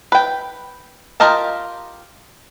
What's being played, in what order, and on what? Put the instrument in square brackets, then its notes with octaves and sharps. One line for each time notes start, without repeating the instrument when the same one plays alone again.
[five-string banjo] B4 G5
F4 G4 A#4 D#5 A5